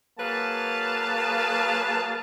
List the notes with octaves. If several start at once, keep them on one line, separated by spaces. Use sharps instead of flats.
F#3 A#3 G#4 B4 F5 A5